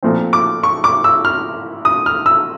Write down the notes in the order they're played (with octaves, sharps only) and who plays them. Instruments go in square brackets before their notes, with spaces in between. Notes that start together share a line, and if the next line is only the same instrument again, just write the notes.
[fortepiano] A#2 F3 A3 C4
D6
C#6
D6
E6
F6
D#6
F6
E6